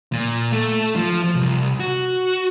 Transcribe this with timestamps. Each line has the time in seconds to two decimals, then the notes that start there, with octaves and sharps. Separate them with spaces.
0.12 A#2
0.52 A3
0.95 F3
1.23 F3
1.35 C2
1.80 F#4